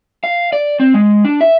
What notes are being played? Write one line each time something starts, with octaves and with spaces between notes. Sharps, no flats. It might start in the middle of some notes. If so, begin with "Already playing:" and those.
F5
D5
C4
G#3
D4
E5